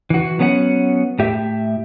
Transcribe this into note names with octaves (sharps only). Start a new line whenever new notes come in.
E3 F#4
F#3 B3 C#4 G4 F#5
A2 G4 E5